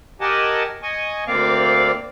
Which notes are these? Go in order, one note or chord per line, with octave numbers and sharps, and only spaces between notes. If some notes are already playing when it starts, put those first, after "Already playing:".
G4 A#4 D#5 F#5 G#5 A5
D#5 G#5 C#6
D2 A#3 C4 D5 F5